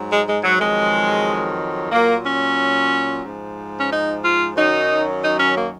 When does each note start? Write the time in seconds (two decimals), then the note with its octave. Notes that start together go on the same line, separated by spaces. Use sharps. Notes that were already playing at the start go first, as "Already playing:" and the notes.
Already playing: G#2 F#3
0.09 G#3
0.26 G#3
0.42 F#3
0.59 F2 D#3 F#3 G#3
1.91 A#2 F#3 A#3
2.24 C#4
3.24 G#2 F3
3.79 C#4
3.90 D#4
4.22 F4
4.55 F#2 D#3 F#3 D#4
5.22 D#4
5.38 C#4
5.55 A#3